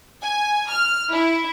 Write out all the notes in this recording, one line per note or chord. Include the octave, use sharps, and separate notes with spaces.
G#5
F6
E4